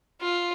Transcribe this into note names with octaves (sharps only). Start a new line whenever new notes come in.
F4